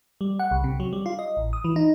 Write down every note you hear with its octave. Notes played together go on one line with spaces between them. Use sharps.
G3
F#5
C2
C3
F#3
G3
F4
D#5
A1
D#6
E3
D#4